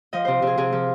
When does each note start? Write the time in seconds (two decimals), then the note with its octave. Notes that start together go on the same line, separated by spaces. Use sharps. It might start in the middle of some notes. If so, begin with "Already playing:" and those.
0.13 F3 D#5
0.25 C3 C5
0.42 C3 G#4
0.57 C3 G#4
0.72 F3